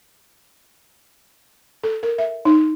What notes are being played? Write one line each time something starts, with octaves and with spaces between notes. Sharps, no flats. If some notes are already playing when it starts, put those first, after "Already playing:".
A4
A#4
E5
D#4